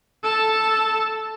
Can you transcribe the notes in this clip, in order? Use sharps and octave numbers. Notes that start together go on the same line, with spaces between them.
A4 A5